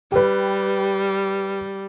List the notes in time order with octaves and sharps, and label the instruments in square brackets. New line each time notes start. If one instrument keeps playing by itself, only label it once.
[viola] G3 [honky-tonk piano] G4 B4